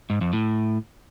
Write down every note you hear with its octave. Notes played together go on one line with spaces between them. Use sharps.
G#2
F2
A2